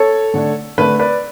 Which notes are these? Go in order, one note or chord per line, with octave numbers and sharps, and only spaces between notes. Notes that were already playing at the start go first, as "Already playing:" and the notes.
Already playing: A4 C#5
D3 A3 D4
D3 A3 D4 B4
B4 D5